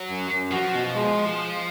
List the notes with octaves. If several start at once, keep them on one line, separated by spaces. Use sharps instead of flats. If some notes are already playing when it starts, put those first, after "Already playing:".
Already playing: F#3
F#2
F#2
F3 F#4
B2
G#3